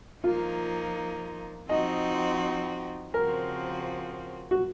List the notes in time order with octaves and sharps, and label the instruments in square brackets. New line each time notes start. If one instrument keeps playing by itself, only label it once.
[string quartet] F3 A#3 D#4 [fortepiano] F4
[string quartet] F3 C4 D#4 F#4 [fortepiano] D#5
[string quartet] C#3 F3 C4 F#4 [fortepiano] A#4
[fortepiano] F#4